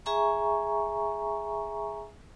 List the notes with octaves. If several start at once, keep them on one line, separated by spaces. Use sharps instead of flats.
G#4 E5 G#5 A#5 C#6